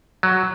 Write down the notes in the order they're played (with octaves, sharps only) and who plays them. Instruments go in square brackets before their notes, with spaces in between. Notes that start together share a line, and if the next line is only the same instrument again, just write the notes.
[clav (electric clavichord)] F#3